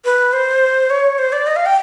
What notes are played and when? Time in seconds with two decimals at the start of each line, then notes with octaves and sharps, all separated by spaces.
0.05 B4
0.33 C5
0.90 C#5
1.18 C5
1.32 D5
1.47 D#5
1.56 F5
1.66 G5